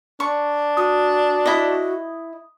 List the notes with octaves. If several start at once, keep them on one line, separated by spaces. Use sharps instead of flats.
D4 C#6
F#4 D#6
E4 D#5